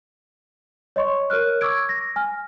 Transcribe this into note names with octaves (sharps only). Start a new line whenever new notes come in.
C#5 D#5 C6 C#6
A#4 C#5 F6 F#6
C#6 D6 E6 G#6 D7
A#6
G#5 F6